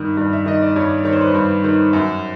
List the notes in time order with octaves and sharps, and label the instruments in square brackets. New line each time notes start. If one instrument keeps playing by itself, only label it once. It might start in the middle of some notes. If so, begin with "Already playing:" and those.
Already playing: [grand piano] G2 D#3 D#5
G2
E5
D#3 D#5
D5
G2 C#5
D#3 C#5
C5
B4
C5
G2
D#3
F#2